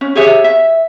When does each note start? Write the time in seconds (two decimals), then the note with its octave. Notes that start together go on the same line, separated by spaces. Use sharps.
0.01 C#4
0.15 G4 G#4 C#5 E5
0.44 E5